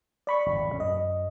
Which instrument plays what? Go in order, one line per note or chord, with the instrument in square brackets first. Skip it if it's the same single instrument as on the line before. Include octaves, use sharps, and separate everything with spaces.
[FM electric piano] D5 B5 C#6
[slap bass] G#1 F2 C3
B1 F#3 C#4
[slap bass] F#2 [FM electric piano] D#5